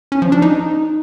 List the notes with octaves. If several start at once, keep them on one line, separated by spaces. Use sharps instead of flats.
C#4
F3
D4
D#4